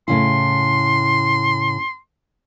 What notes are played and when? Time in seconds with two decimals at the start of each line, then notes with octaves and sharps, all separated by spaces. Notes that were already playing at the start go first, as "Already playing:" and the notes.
0.08 A2 C#3 E4 C6